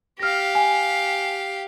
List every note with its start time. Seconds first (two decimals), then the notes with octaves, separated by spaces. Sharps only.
0.19 G4 F5 F6 A#6
0.55 G#5